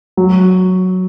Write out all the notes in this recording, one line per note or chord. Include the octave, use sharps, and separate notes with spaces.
F#3